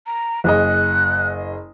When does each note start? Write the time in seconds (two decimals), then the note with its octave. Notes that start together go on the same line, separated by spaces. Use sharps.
0.06 A#5
0.44 F#1 G#4 D#5 F#6